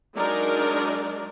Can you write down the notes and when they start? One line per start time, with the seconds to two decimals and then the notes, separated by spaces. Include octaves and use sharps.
0.16 F#3 G#3 D4 D#4 A#4 D5